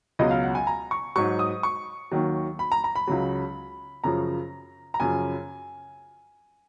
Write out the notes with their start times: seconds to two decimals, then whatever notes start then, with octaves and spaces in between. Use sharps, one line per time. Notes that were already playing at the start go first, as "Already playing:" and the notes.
0.19 C#2 B2 F#3 D#5
0.31 F5
0.43 F#5
0.55 G#5
0.67 A#5
0.91 C#6
1.16 G#2 F#3 C#6
1.39 D#6
1.63 C#6
2.11 D#2 D#3 F#3
2.59 B5
2.72 A#5
2.84 A#5
2.96 B5
3.07 C#2 C#3 F#3
4.04 F#2 C#3 F3 A#5
4.94 A#5
5.00 F#2 C#3 F3 G#5